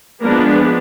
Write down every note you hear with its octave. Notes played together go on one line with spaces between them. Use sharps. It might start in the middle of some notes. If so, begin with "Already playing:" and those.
F3 G#3 A#3 B3 D4 A#4